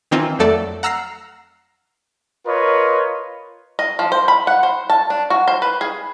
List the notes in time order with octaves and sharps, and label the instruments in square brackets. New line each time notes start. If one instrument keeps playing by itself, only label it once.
[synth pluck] D#3 E3 C4 D#4 F4
F2 F#3 A3 A4 D5
F#5 A#5 E6 F6 A#6 C7
[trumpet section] F4 A#4 B4 C#5 D#5
[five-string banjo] D#5
F3
C5
B5
F#5
C5
A5
D4
F#4
C5
B4
G#4